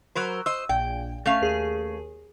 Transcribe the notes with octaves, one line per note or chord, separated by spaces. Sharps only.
F#3 A#4 C5 B5 E6
C5 D#5 E6
A#1 A#2 G5
A3 C#4 F5
D#2 G#4